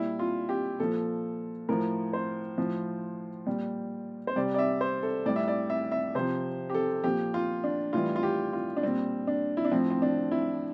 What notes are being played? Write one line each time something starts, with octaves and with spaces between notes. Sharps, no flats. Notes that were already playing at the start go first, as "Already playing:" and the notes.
Already playing: A#2 G3 E4
F4
G4
A#2 F3 A4
A2 F3 A#4
C5
A2 F3
A#2 G3
C5
C3 G3 D5
D5
E5
C5
A4
A2 G3 D5
E5
D5
E5
E5
C3 F3 C5
G4
A4
A#2 F3 G4
F4
D4
A2 E3 G3 F4
F4
G4
F4
D4
A#2 G3 C4
D4
E4
D4
A2 F3 C4
C4
D4
E4